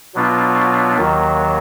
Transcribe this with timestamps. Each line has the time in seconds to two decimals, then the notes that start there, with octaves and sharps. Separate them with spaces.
0.15 B2 F#3 B3 D4 F4
0.97 D#2 D#3 F#3